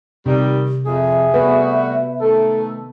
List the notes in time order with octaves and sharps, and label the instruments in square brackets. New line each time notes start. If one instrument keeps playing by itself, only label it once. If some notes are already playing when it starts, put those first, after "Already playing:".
[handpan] C3 [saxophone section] D#3 G3
[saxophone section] F2 [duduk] G#4 [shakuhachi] E5
[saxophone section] G3 A3 F#4 [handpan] B3 B4
[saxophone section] D#3 A3 [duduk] A4